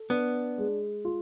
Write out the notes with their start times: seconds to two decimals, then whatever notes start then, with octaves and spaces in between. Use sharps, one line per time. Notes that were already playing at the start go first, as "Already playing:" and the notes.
Already playing: A4
0.10 B3 D4
0.58 G#3
1.05 F4